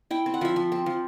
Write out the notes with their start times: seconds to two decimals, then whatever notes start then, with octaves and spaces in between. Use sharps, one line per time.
0.11 E4 G5
0.26 C4
0.34 F#5
0.41 F3 E5
0.56 F3
0.72 C4
0.86 F3